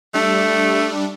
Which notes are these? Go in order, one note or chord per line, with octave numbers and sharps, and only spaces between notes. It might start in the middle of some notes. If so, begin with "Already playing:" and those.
G3 A3 D4